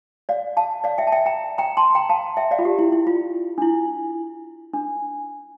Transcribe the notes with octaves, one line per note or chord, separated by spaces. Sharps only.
D5 F5
F5 A5
D5 F5
E5 G5
A5
E5 G5
G5 A#5
G5 A#5
A5 C6
G5 A#5
F5 A5
E5 G5
D5 F5
F4
G4
E4
E4
F4
D4
E4
D4